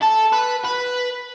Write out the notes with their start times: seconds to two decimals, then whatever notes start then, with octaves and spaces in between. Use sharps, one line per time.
0.02 A4
0.32 B4
0.65 B4